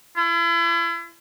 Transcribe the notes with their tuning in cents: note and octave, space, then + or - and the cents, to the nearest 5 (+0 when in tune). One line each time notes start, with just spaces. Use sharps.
E4 +40